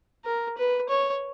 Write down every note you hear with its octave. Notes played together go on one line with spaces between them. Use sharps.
A#4
B4
C#5